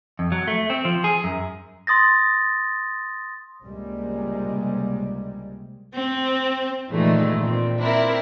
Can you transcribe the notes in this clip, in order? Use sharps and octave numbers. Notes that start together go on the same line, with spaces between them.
F2
F#3
A3
C4
F3
G#4
F#2
C6 D#6 A6 A#6
C#2 C3 G3 G#3 A#3
C4
A#2 D#3 E3 G#3 A3
A#2 C4
C4 D4 E4 A#4